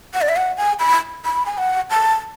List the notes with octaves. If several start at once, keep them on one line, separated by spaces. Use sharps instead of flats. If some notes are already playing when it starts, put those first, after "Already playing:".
F#5
D5
E5
F#5
G#5
B5
B5
G#5
F#5
A5